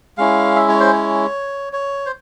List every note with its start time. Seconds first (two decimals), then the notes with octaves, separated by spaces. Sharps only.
0.18 G#3 C#4 E4 F5
0.56 E5
0.68 C#5
0.80 C5
0.92 C#5
1.73 C#5
2.06 C5